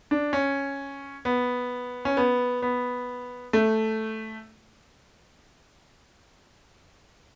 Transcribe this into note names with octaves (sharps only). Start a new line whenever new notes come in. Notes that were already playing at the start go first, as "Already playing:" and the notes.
D4
C#4
B3
C#4
B3
B3
A3